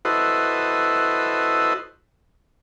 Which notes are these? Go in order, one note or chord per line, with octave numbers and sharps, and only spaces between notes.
E4 F#4 A4 B4 C5 D#5